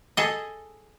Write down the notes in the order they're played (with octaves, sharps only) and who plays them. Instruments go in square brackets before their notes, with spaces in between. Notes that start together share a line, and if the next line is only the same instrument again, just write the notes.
[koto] G#4 A4 D#5